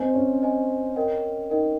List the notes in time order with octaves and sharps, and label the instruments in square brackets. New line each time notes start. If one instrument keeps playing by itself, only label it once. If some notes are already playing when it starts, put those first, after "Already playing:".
Already playing: [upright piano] C4 [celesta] C5 D#5 G#5
[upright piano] C#4
[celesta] C5 D#5 G#5
A#4 D#5 G5
[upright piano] D#4 [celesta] A#4 D#5 G5